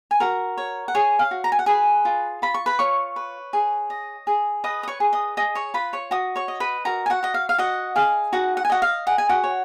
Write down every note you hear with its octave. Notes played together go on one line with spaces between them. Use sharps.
G#5
F#4 A#4 A#5
C#5
F#5
G#4 C#5 G#5
F5
F#4
A#5
G#5
F#5
G#4 B4 G#5
F4
F4 B5
C#6
B4 B5
F4 C#5 C#6
B4
G#4
D#5
G#4
B4 D#5 D#6
D#6
C#5 C#6
G#4
D#5 D#6
G#4 D#5 D#6
C#5 C#6
F4 B4 B5
C#5 C#6
F#4 D#5 D#6
C#5 C#6
D#5
B4 B5
F#4 A#4 A#5
G#5
F#4 F#5
F#4 D#5
F5
F5
F#4 D#5 F#5
G#4 F5
D#4 F#4 F#5
F#5
G#5
F#4 D#5 F#5
F5
G#4 F#5
G#5
F#4 F#5
C#5